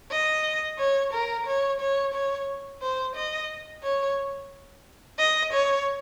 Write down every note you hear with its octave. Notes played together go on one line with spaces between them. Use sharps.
D#5
C#5
A#4
C#5
C#5
C#5
C5
D#5
C#5
D#5
C#5